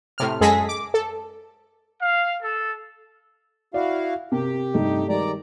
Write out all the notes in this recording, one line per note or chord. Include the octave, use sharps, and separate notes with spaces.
A2 C3 F6
F#2 G#3 G#4 A4 A#6 B6
D6
A4
F5
A4
E4 F#4 D5 F5
C3 G4 A#4
G2 C3 A3 D#4
D#3 G3 G#3 D5 A#5